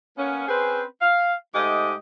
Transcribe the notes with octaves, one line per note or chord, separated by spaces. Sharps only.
A#3 B3 C#4
C4 C#4 G#4 B4 C5
F5
G#2 A3 G4 D#5